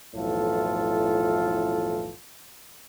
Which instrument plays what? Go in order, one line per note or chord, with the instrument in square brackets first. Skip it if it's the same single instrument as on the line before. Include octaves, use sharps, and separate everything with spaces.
[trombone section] B1 F2 A2 E3 F4 A4